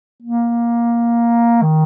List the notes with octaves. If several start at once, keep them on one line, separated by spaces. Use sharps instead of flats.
A#3
D#3